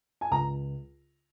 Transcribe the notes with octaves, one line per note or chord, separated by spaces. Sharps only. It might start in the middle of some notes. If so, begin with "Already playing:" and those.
G#5
C#2 A#5